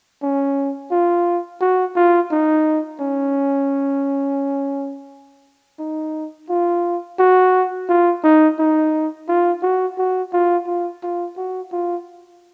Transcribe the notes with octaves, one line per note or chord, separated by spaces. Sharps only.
C#4
F4
F#4
F4
D#4
C#4
D#4
F4
F#4
F4
D#4
D#4
F4
F#4
F#4
F4
F4
F4
F#4
F4